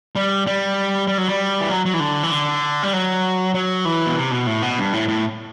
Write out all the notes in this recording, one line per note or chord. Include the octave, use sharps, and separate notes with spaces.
G3
G3
G3
F#3
G3
E3
F#3
F#3
E3
D3
E3
D3
G3
F#3
F#3
E3
B2
C3
B2
A2
B2
G2
A2
A2